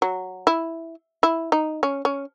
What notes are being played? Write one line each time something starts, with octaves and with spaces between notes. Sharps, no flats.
F#3
E4
E4
D#4
C#4
C#4